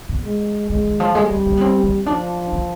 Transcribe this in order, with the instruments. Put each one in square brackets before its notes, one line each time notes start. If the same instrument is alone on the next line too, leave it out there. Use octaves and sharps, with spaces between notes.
[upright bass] B2
[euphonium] G#3
[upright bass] C3 [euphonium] G#3
[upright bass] D#3
F3
[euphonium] G3 [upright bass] G#3
[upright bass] C4
D4
B3
C4
C4
[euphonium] F3 [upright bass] D4
[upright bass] D4